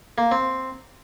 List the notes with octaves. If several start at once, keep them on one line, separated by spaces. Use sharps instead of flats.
A#3
C4